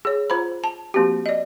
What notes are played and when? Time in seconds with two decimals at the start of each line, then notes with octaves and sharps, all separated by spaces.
0.05 G#4 C#5
0.30 F4 C5 A#5 B5
0.64 A5
0.94 F3 A#3 C4 F#4 G4
1.26 D5 D#5